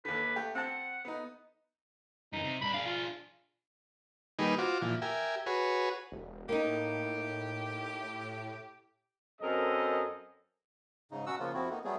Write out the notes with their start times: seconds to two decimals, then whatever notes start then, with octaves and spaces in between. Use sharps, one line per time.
0.05 D#2 D3 B4
0.36 A3 G4
0.55 C4 F#5 A5
1.05 B3 D#4
2.33 F#2 E3 D#4
2.44 C3
2.62 G2 D4 B5
2.74 D4 G#4 F5
2.86 F4
4.39 D#3 G3 A#3 D#4 G#4 B4
4.59 F4 F#4 C5 D6
4.82 A#2 E3 F3
5.02 G4 A#4 E5 G#5
5.46 F#4 G#4 B4 C#5
6.12 E1
6.49 A2 A#3 D#4 G4
9.41 F#2 C4 A4 A#4 D#5
11.11 G#2 C#3 D#4
11.26 B2 F#3 C#4 F#4 F#5 E6
11.39 C#3 F3 A#3 F4
11.54 F2 F3 C4 E4 F#4
11.70 A#3 B3 D#4
11.84 F#3 G3 A3 B3 G#4